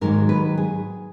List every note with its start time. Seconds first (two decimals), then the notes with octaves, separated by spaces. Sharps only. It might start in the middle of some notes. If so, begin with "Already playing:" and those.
0.01 G#2 D#3 F#3 A#3 A#4
0.29 B4
0.57 G#4